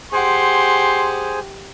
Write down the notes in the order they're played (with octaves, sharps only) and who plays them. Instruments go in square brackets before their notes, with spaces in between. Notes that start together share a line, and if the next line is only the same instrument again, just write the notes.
[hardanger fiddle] G4 F#5 [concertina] G#4 C5 G#5 [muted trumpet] C6